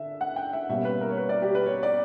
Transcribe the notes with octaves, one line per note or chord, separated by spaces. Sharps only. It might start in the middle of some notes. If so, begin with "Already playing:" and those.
Already playing: D3 E5
F#5
G5
E5
B2 G3 A#3 C#4 E5
B4
A#4
C#5
B4
D5
G4
B4
C#5
D5